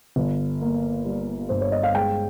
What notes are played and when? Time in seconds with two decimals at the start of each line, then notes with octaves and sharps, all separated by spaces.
0.16 G1
0.61 A#3
1.05 G3
1.49 G2 C5
1.61 C#5
1.72 D#5
1.83 F5
1.94 G#3 G5